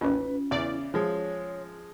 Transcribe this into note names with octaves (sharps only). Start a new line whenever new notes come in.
A1 D#2 C#4 F4 B4
E2 C#3 E4 D5 E5
F3 G#3 C#5